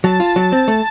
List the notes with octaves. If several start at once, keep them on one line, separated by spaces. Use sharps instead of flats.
F#3 A5
F4
F#3
C4
A3